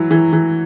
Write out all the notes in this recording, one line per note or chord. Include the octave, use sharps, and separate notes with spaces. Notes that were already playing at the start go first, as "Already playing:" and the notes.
Already playing: E3 F#3
E3
E3